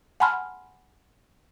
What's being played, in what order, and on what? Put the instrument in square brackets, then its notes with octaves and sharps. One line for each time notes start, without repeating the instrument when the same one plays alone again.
[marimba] F#5 G#5 A5 B5 C6 F6